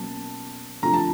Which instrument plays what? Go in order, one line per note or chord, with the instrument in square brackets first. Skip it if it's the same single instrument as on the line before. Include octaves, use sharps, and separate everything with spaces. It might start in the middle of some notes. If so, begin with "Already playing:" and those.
Already playing: [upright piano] B2 F#3 A#3 C#4 [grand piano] A5
[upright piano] D2 C3 F3 [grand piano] A#5
[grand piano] A5